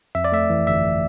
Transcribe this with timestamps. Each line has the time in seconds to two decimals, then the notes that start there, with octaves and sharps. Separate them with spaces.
0.15 F2 E5
0.24 D5
0.32 A3 E5
0.50 E3
0.66 G1 E5